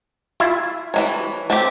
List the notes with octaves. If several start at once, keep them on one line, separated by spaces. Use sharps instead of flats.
E4 F4 E5
E3 A#3 C#5
A3 C4 G4